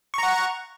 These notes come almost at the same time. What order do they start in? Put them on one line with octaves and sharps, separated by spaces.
C#6 A#5 F#5